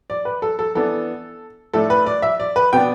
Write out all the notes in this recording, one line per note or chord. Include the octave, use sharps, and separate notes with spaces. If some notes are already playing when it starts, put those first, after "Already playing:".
D5
B4
A4
A4
E3 B3 D4 A4
A2 A3 D4 A4
B4
D5
E5
D5
B4
B2 B3 D4 G5